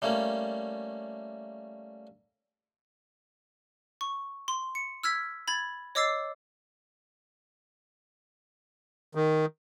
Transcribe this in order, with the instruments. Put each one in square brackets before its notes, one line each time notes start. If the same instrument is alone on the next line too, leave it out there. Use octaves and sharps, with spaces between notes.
[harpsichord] G3 A3 A#3 C#4
[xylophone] C#6
C6
C#7
E6 F6 G#6 B6
B5 G#6 A6
C#5 D#5 D6 E6 A6 C7
[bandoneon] D#3